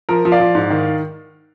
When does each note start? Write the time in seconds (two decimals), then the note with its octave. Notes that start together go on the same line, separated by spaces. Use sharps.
0.09 F3 A#4
0.25 F3
0.32 D5 F5
0.40 F3
0.55 G#2
0.70 D#3